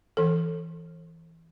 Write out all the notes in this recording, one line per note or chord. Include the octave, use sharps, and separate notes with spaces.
E3 A4